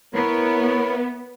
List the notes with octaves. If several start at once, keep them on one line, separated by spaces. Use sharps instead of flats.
B3 E4 A#4 C#5